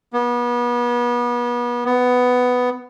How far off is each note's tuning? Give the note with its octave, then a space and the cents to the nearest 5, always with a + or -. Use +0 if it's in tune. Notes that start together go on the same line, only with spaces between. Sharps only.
B3 -35
B3 +10